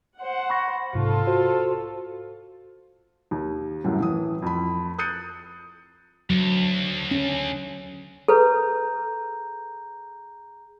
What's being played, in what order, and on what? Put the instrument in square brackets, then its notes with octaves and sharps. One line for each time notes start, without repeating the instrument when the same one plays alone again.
[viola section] C5 F#5
[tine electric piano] B5 C#6 A#6
[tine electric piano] B1 G#2 C3 [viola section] F4 A4
[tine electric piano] F#4 C5
[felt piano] D#2
C2 F#2 A2
A2 E3 D#6
F2 B5
D#6 F#6 G6 A6 C#7 D#7
[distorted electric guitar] D2 [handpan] F#3
[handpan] C#4
[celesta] G#4 A#5 G6 [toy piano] A4 B4